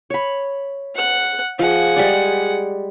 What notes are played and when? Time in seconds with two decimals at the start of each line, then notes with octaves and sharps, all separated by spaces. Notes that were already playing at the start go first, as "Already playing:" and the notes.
0.10 C#5 B5
0.95 F#5 F#6
1.59 F3 G#4 F#5
1.96 G3 G#3 D5